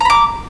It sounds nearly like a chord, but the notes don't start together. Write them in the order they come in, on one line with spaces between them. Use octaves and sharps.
A#5 B5 D6